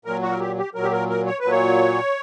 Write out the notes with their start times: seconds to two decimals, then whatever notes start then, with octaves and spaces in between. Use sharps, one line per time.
0.05 A#2 F#3 A#4
0.22 F#4
0.31 A#4
0.40 G4
0.58 G4
0.74 A#2 F#3 A#4
0.83 G4
0.92 A#4
1.10 A#4
1.27 C#5
1.39 B4
1.44 A#2 F#3
1.52 C#5